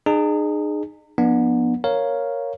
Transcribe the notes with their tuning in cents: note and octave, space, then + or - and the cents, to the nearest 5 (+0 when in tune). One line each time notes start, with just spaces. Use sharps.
D#4 -40 G#4 +0
F3 +0 B3 -25 D4 +20
A#4 +0 C#5 +0 F5 +0